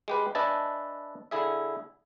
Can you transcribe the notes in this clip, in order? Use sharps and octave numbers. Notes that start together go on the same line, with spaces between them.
G#3 G4 B4
D4 B4 D#5 E5 G#5 A5
D3 E4 G#4 E5